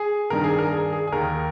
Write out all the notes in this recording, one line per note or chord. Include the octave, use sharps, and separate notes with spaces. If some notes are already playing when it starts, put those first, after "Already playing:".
Already playing: G#4
G2 D#3 A#4
G#4
A#4
G#4
G#4
G#4
D#2 D#3 A#4